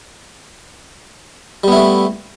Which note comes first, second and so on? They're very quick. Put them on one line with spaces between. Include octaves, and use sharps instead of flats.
G3 B3 E4 A3